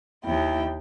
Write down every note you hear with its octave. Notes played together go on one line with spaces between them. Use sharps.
D#2 E4 G5